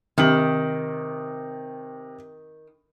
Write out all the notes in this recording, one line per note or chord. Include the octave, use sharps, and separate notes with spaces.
C3 D#3 F#7